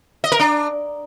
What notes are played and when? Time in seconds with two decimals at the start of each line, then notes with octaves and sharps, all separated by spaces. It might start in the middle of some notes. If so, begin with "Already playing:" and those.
0.24 D#5
0.32 A#4
0.40 D4